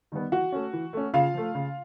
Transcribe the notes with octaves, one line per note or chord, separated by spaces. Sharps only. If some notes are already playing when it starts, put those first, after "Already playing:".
D#3 G3 B3
E3 F#4 F#5
A3 C#4
E3
A3 C#4
C#3 F4 F5
F3 A3
C#3